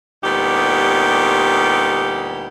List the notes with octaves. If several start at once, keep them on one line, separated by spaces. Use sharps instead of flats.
D2 A#2 G3 B3 D#4 G4